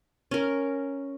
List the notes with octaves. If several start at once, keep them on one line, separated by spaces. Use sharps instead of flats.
C#4 A#4